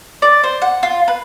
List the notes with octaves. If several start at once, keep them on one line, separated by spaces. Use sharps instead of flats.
D5
C5
F#5
F4
B4